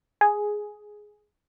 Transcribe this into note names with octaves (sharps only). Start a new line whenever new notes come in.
G#4